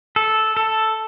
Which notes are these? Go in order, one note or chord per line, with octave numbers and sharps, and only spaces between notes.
A4
A4